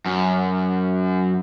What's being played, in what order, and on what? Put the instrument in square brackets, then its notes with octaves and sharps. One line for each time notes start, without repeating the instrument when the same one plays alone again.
[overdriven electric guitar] F#2